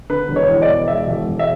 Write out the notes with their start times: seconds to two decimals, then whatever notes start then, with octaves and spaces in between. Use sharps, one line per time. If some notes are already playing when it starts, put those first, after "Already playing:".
0.10 D3 B4
0.28 E1
0.36 C#5
0.49 E2
0.62 D5
0.68 E1
0.88 E1 E5
1.07 E1
1.26 E1
1.39 E5